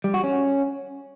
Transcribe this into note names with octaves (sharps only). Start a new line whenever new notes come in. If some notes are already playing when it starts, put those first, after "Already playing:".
G3
F#4
C#4